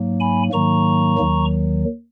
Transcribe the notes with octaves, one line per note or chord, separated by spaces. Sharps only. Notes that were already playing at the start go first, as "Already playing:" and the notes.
Already playing: G#2 F#3 A#3
G#5 B5
G#2 D#3 F#3 A#3 A#5 C#6
D#2 D#3 F#3